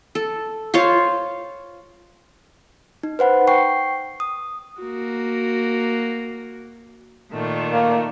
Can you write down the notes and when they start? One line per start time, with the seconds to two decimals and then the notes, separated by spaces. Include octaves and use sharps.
0.15 A4
0.74 F4 C5 C#5 F5
3.03 D#4
3.19 B4 C5 F#5 B5
3.47 G5 C#6 C7
4.20 D#6
4.81 A#3 F#4
7.32 A#2 D#3 A3
7.73 A#3